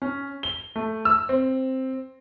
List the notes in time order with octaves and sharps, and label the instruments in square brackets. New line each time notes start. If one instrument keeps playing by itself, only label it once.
[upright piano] C#4
G7
A3
E6
C4